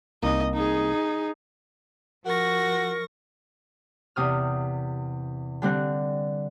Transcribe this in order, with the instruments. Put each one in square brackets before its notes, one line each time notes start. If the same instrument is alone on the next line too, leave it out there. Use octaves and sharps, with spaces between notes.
[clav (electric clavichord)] C2 A#3 [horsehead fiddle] D#4 D#5
[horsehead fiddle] D#4 G#4
[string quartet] F3 C#6 A#6 [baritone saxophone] F#4 [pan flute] A#4
[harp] E2 C3 D#6 F6
D3 G3 C4 F#6